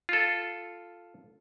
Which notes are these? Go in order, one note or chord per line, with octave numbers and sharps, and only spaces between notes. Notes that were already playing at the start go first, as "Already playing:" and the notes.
F4 A4